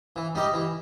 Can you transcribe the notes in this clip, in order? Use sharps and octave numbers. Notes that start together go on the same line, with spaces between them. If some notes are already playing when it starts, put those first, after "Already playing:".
E3
G3 D#4 G4 D#5
E3